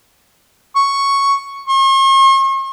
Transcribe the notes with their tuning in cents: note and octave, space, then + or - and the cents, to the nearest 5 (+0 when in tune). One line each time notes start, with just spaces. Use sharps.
C#6 +0
C#6 -45